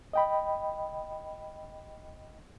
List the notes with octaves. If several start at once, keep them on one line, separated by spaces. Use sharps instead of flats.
D#5 G5 B5